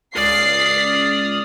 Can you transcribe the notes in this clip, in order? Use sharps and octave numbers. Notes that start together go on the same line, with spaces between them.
C#2 D5 D#6 F6 C7